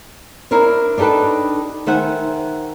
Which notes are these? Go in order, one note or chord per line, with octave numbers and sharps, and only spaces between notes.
D4 E4 A#4 C5 C#5
D4 D#4 G4 A4 B4
D#3 C5 E5 F#5 G#5